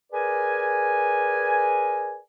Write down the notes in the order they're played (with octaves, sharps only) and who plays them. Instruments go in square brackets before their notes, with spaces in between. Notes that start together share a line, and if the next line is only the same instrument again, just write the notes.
[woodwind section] G#4 A#4 B4 D5 G#5